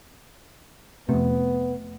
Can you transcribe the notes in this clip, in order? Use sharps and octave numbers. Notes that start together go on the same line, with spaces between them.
F2 C3 A3 B3